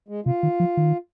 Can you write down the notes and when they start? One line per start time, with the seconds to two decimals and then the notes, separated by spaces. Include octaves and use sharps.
0.08 G#3
0.26 C3 F4
0.43 D#3
0.60 F3
0.77 D#3